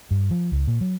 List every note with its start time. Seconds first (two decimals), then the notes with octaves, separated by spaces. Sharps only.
0.11 G2
0.31 F3
0.52 C#2
0.68 A#2
0.81 F#3